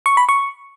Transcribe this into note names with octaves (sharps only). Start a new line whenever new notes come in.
C#6
B5
C#6